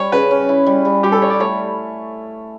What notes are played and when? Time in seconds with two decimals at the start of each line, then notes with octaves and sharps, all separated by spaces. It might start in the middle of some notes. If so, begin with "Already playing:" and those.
Already playing: G3 C#5
0.12 C#3 B4
0.31 C#4
0.49 E4
0.66 G3
0.85 G3
1.03 G3 G4
1.12 A4
1.22 G3 C#5
1.30 D5
1.40 A3 C#5